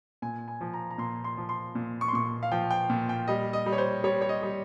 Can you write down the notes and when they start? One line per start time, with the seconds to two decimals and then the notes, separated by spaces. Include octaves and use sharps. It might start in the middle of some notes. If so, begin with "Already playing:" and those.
0.22 A#2 G#5
0.48 G#5
0.61 F3
0.74 A#5
0.91 A#5
0.98 A#2 C6
1.24 C6
1.37 F3
1.49 C6
1.75 A#2
2.01 C#6
2.08 C6
2.13 A#2 C#6
2.43 F5
2.52 F3 G5
2.71 G5
2.90 A#2
3.09 G5
3.28 G3 D#5
3.53 D#5
3.66 G3
3.72 C#5
3.78 C5
4.04 G3 C#5
4.21 C#5
4.29 D#5
4.43 G3